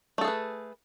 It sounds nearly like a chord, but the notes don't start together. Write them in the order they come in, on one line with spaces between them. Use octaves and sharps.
A3 A4 G#4 B4